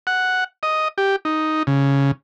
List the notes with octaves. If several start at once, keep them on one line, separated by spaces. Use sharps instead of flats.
F#5
D#5
G4
D#4
C#3